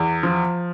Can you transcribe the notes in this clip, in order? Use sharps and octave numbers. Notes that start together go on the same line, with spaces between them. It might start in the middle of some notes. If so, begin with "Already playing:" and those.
Already playing: E2
F3